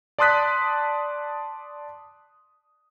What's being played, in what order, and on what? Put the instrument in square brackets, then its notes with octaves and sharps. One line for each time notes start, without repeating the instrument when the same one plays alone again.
[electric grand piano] D5 A5 C6 D#6 F#6 B6